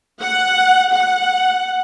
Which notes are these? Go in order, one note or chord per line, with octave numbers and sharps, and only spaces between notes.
F#5
F#5